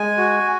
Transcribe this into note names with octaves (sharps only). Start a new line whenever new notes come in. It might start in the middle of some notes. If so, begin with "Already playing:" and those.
Already playing: G#3 G#5
F#4